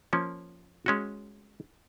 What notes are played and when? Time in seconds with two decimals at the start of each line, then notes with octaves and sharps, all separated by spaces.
0.13 F3 A#3 C#4
0.86 G#3 C#4 F#4